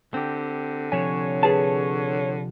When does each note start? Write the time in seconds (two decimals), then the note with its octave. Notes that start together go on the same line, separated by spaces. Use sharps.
0.14 D3 C4 G4
0.92 C3 F3 C#5 G#5
1.43 G#4 B4 A5